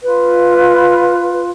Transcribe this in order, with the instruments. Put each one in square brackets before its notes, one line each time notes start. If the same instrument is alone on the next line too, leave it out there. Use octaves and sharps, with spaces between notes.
[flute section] F4 B4